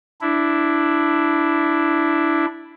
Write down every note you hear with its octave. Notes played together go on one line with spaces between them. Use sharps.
D4 E4